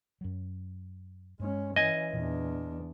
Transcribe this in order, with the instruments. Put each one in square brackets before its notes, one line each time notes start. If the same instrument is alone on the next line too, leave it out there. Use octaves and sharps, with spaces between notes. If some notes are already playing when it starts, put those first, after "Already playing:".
[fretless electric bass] F#2 F#3
[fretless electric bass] G2 [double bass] G#3 C#4
[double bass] E3 C#4 [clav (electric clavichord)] D#5 G#5
[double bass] E2 D4 [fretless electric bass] A#2 E3